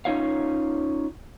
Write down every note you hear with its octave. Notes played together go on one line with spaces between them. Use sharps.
C#4 D#4 F4 C#5 F5